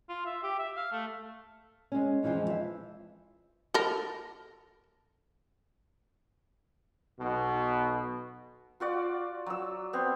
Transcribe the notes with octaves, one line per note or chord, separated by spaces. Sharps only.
F4
E5
G4
E5
F5
A3
G#3 C#4
F2 E3 F3 G#3 F4
E5
A4 A#4
B1 B2
F4 F#4 D5
F#3 E6
B3 C4